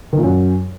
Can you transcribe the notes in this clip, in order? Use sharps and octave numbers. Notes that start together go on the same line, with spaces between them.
D#3
A#2
F#2